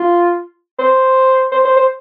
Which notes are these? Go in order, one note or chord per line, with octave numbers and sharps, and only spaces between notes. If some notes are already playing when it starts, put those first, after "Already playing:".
Already playing: F4
C5
C5
C5
C5